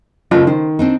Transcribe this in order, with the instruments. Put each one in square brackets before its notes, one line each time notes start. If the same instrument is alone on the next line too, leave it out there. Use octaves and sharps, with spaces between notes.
[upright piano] F#1 [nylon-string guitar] A3 F4
[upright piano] D#3 [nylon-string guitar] C5
[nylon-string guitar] C4 D4 D#4